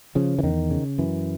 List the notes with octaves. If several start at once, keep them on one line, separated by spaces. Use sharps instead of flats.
C#3 F3
E3
E2 D#3
C#3
F#2 E3